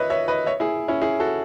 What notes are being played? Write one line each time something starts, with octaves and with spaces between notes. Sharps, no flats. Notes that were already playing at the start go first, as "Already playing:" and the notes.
Already playing: B4 C#5 D#5 E5
C#5 E5
B4 D#5
C#5 E5
E4 G#4
C#4 E4
E4 G#4
F#4 A4